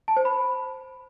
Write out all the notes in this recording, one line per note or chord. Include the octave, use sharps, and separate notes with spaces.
A5
C5
B5